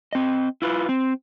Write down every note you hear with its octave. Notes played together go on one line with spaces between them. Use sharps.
C4 D#5
E4 F4 B4
C4